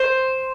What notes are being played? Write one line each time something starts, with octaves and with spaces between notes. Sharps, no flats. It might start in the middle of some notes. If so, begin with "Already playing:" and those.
Already playing: C5